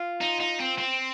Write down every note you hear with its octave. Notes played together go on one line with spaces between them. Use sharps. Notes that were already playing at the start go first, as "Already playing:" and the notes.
Already playing: F4
D#4
D#4
C4
C4